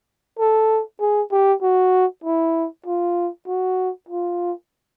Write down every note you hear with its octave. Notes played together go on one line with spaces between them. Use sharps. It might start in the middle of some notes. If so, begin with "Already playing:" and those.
A4
G#4
G4
F#4
E4
F4
F#4
F4